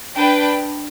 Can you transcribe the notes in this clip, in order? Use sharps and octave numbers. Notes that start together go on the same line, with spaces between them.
D4 B4 G5